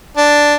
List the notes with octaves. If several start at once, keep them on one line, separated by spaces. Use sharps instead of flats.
D4